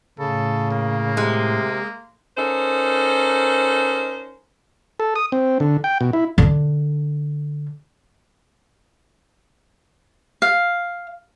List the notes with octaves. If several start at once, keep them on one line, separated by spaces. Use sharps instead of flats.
A2 C#3 A4
A#3
C3 G#3
C#4 D#4 A4 A#4 C5
A4
D#6
C4
D3
G5
B2
E4
D3 D4
F5